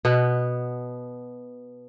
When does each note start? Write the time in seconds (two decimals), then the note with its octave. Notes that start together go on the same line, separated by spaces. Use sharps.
0.05 B2 B3